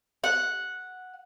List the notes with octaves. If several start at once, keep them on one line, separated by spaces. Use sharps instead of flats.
F#5